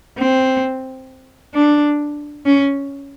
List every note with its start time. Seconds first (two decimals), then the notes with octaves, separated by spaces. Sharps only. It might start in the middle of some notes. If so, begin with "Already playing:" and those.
0.18 C4
1.54 D4
2.45 C#4